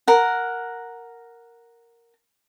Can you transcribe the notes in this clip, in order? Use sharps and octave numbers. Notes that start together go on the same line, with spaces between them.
A#4 F#5